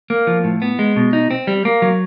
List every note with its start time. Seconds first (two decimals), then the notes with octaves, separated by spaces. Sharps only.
0.10 A#3
0.27 F3
0.44 A2
0.62 B3
0.79 G#3
0.96 B2
1.13 D#4
1.31 C4
1.47 G3
1.65 A#3
1.82 F#3